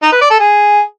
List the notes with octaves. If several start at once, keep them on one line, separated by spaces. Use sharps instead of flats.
D#4
B4
D5
A4
G#4